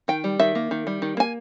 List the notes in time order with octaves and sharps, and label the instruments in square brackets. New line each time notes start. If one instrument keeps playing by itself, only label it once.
[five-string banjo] D#3 G5
G3
D#3 E5
A#3
D#3
G3
D#3
A#3 G#5